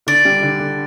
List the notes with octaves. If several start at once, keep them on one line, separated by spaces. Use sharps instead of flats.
D3 D5
G3
D3
D3